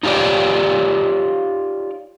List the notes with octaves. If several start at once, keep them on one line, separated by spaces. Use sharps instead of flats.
D#4 F4 G4 C#5 D5